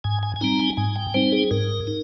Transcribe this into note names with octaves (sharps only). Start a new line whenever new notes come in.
G#2 G#5
G#5
G#5
G3 C4 D#4 A#5
G#5
G#2 G#5
G5
G3 C4 D#4 C5
G#4
G#2 A#4
D#4